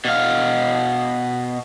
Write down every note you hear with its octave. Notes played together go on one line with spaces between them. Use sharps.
B2 F5